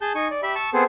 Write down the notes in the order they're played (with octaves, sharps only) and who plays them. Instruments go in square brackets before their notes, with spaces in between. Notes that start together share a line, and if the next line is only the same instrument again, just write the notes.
[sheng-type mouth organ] G#4 A5 G6
D#4 G#5 C#6
D5
G4 E5 B5
A5 C#6 E6
B3 C4 G#4 A4 C5